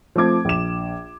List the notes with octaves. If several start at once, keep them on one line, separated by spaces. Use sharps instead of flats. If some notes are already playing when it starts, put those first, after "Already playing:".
F3 A3 C4 D6 G#6
A#1 E7